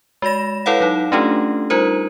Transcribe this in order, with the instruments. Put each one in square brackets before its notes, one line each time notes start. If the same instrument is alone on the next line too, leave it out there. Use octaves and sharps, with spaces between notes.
[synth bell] G#3 F#4 D5 A#6 E7
E4 A4 B4 C#5 F5 F#5
F#3 D#4
A3 C#4 D4 F4 G4 A4
G3 D#4 F4 A#4 C5